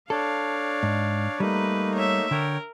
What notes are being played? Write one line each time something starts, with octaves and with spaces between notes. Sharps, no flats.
D4 A4 C#5 D5 F5
G#2
G3 A3 A#3 D#4 B4
C#5 E5
D3 A#4 C#5 G5